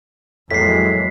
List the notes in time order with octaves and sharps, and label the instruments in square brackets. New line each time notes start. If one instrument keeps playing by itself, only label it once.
[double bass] F2 F#3 [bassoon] A2 [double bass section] E3 G#3 A#3 [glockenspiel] B6 C7